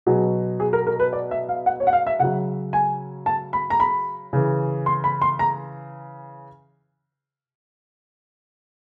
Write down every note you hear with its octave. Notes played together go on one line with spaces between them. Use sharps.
B2 F#3 G#4
G#4
A#4
A#4
B4
D5
E5
F5
F#5
C#5
F#5
F5
E5
C#3 F#3 F#5
G#5
A5
B5
A#5
B5
C#3 E3
C6
B5
C6
A#5